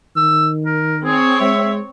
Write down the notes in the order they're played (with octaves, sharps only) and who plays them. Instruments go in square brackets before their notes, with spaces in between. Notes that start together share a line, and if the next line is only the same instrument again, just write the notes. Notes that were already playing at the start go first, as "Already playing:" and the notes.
[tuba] D#3 [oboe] E6
[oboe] A#4
[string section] C4 C#5 [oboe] G#4
[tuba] G#3 [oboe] E5